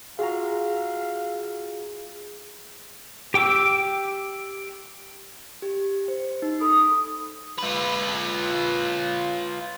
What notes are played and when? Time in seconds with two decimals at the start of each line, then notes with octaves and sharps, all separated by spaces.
0.19 F4 F#4 G#4 F5 A#5
3.34 G4 G5 D6 E6
5.62 G4
6.08 C5
6.42 D#4
6.61 A4 B5 D#6
7.58 F4 B4